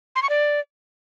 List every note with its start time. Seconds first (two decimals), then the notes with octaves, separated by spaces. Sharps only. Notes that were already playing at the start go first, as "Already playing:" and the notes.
0.16 C6
0.23 C#6
0.30 D5